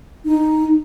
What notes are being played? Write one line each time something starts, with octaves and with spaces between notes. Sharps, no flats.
D#4